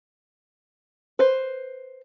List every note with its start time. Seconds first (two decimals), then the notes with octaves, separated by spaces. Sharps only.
1.19 B4 C5